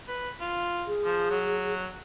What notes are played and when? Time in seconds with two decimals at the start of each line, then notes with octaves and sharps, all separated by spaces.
0.08 B4
0.41 F4
0.87 G#4
1.04 F3
1.30 F#3